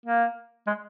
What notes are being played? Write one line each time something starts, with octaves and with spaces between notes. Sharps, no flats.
A#3
G#3